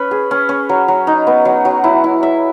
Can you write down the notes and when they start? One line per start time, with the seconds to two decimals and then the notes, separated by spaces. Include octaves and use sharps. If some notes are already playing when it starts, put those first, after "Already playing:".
Already playing: C#4 B4
0.11 G#4
0.31 C#4
0.49 C#4
0.69 F#3
0.88 F#3
1.07 D#4
1.27 B3
1.45 F#3
1.65 F#3
1.84 E4
2.04 E4
2.23 E5